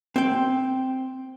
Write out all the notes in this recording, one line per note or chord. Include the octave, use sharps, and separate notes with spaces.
C4 G5